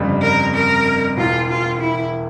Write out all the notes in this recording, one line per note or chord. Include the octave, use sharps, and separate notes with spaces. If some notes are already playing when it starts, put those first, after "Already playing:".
Already playing: G1 F2 C#3 G3
A#4
A#4
E1 E2 E3 F4
F4
E4